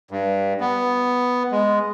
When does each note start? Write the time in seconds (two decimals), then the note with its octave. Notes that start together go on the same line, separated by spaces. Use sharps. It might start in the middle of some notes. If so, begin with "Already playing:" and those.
0.11 G2
0.60 B3
1.51 G#3